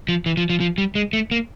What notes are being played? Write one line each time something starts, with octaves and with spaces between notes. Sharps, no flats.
F3
E3
F3
F3
F3
G3
G#3
A3
A#3